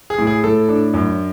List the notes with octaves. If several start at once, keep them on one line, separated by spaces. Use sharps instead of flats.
G#4
A2
G#4
A2 A4
D4
F#2